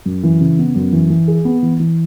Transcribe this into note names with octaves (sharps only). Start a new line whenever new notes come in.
F#2
E3
C#3
B3
F#2
E3
E3
G#4
B3
E3
E3